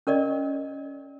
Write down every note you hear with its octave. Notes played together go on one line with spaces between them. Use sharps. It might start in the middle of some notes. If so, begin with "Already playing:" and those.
C#4 A#4 D5 D#5